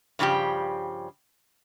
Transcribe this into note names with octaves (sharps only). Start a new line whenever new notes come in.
G2 C#3 F3 G3 G4